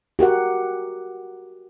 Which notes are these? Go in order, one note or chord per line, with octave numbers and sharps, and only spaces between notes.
F#4 G4 A#4 F#5